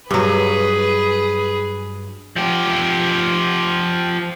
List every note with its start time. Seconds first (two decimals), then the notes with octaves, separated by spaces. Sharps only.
0.11 G2 F#3 G#4 B4
2.36 F3 G4